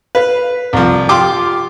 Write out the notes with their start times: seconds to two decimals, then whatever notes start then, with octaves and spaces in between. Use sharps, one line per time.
0.15 B4 F5
0.73 C2 F3
1.09 F4 G4 C6 D6